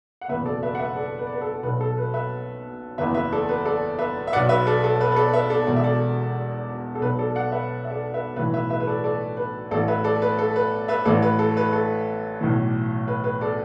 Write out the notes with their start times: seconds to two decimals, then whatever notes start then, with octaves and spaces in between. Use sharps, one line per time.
0.21 F#5
0.28 F#1 E2 B2 B4 E5
0.45 A4 D5
0.63 B4 E5
0.75 F#5
0.79 B4 E5
0.96 A4 D5
1.19 B4
1.27 D5
1.33 B4
1.42 A4
1.63 B1 B2 B4
1.81 A4
1.98 B4
2.14 B4 E5
2.98 F#1 E2 E3 B4 E5
3.14 B4 E5
3.32 A4 D5
3.49 B4
3.65 A4 D5
3.99 B4 E5
4.27 E5
4.32 B2 D5 F#5
4.36 B1
4.49 B4 E5
4.67 A4 D5
4.84 A4
5.01 B4
5.12 B4
5.16 A4 D5
5.33 B4 E5
5.50 A4 D5
5.67 E1 E2 B2 D5
5.76 E5
5.84 A4 D5
6.95 A4
7.01 B1 B4
7.06 B2
7.19 A4 D5
7.35 D5 F#5
7.52 B4 E5
7.85 E5
7.91 A4 D5
8.14 B4 E5
8.36 B1 A2 E3 B4 E5
8.54 B4 E5
8.70 B4 E5
8.80 B4
8.87 A4 D5
9.04 A4 D5
9.37 B4
9.71 A1 A2 E3 A4 D5
9.88 B4 E5
10.04 A4 D5
10.22 B4
10.38 A4
10.56 B4
10.88 B4 E5
11.05 A1 A2 E3 A4 D5
11.22 B4
11.39 A4
11.57 B4
11.73 A4
12.41 B1 A2 E3
13.08 B4
13.24 B4
13.41 A4 D5